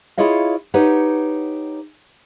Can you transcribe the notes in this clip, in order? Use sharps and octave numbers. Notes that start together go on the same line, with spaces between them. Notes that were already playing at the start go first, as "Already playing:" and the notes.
E4 F4 G#4 C#5 D#5 F5
D#4 G4 B4 C#5 F#5